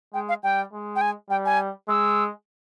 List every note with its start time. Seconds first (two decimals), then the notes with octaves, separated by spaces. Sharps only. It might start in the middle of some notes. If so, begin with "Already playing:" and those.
0.14 G#3 G5
0.29 F5
0.43 G3 G5
0.73 G#3
0.96 G5
1.01 G#5
1.30 G3 G5
1.45 G#5
1.89 G#3 E6